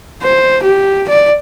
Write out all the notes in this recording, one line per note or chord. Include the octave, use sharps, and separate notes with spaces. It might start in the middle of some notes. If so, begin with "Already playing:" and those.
C5
G4
D5